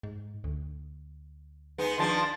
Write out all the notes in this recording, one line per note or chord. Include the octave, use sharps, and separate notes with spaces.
G#2
D2
G#3 B3 D#4
D#3 F3 D4 A5 C6